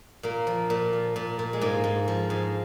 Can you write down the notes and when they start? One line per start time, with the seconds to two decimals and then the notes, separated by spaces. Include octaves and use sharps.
0.23 A#2 A#3
0.47 F3
0.70 A#2
0.93 F3
1.16 A#2
1.39 A#2
1.53 G#3
1.61 G#2 A#3
1.84 G#2
2.08 F3
2.30 G#2